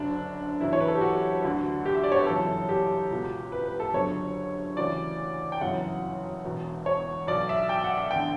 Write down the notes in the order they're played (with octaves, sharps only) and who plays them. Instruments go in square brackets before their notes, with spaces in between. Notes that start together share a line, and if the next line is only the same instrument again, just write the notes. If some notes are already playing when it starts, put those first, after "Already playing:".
Already playing: [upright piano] F#1 F#2 D3 D4
F#1 F#2 E3 E4
C#5
B4
A4
G4
F#4
D2 D3
G4
E5
D5
C#5
B4
G1 F#2 C#3 E3 A4
G4
C#2 B2
B4
B4
A4
F#1 F#2 D3 C#5
D2 C#3 E3 D5
G5
G1 F#2 C#3 E3 F#5
E1 E2 B2
C#5
B1 B2 D5
E5
G5
F#5
E5
A1 D3 G5